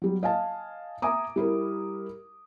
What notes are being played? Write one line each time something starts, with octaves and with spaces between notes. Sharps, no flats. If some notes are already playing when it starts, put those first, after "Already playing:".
F#3 G3
D#5 F5 G#5 A5
E5 G#5 A#5 D6 D#6
G3 E4 A#4